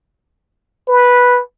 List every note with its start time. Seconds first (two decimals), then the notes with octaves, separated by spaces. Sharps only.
0.88 B4